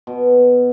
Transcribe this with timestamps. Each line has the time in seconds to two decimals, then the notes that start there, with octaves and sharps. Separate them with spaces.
0.07 B2